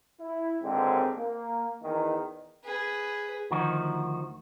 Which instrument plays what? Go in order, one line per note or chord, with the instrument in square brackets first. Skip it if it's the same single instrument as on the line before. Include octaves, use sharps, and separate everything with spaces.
[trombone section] E4
G#1 D#2 G#2 D3 C4
A#3
E2 D#3
[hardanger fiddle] G#4 B4
[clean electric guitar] D2 D#3 F3 D#4 F#4